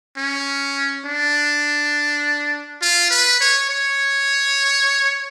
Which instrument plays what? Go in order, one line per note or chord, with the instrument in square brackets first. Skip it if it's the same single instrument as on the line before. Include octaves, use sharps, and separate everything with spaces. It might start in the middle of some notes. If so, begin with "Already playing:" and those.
[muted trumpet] C#4
D4
F4
B4
C#5
C#5